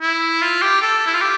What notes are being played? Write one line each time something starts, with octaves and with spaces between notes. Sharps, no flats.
E4
F4
G4
A4
E4
F4
G4